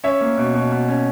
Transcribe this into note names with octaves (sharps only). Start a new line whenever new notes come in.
C#4 C#5 E5
A#3
B2
B2
B2
C#4